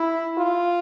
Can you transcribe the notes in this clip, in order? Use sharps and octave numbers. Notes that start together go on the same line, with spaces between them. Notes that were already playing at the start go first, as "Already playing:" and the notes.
Already playing: E4
F4